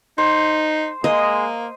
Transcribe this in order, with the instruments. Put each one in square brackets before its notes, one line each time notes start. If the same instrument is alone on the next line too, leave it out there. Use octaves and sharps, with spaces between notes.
[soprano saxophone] D#4 [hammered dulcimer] C5
[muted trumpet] G#3 [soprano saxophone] A#3 [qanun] D#5